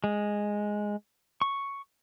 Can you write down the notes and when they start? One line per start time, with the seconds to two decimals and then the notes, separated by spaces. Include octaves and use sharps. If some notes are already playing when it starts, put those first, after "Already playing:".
0.04 G#3
1.42 C#6